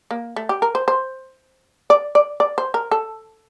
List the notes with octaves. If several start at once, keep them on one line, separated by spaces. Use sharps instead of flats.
A#3
A3
G4
A#4
C5
C5
D5
D5
D5
C5
A#4
A4